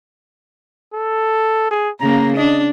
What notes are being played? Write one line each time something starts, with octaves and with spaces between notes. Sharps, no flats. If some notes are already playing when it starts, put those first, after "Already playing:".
A4
G#4
C#3 A#3 A#5
D4 D#5